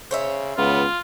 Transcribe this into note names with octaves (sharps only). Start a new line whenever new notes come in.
C#3 C5 C#5 E5
C#2 B3 F4